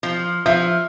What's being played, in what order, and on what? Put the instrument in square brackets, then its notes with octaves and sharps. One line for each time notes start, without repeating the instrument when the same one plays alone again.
[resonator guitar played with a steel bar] F3
[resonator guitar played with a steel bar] F3 [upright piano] E5